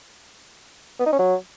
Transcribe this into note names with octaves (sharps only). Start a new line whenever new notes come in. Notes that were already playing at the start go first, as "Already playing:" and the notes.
B3
D#4
C#4
F#3